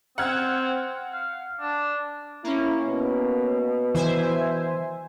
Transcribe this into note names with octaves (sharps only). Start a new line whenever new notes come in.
C4 F#5 F6 G#6
F5
D4
A#3 C#4 E4
B2
E3 C5 E5 G#5